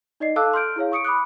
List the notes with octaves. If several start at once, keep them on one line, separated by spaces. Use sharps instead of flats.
D#4 D5 D#5 C7
A4 F5 A5 D6 E6 F#6
C6 F6 G6 D7
E4 G#4 C#5 F5
C#6 D#6 C#7 D7
B5 D6 D#6 F#6